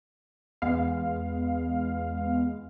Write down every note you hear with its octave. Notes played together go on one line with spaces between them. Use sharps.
E2 G#3 B3 F5